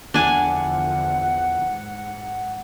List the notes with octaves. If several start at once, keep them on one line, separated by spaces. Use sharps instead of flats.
E2 D3 F3 D4 F#5 G#5
G#2